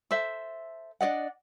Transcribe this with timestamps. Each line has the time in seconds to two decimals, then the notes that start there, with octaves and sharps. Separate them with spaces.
0.11 A4 C5 E5
1.01 D4 D5 D#5 F#5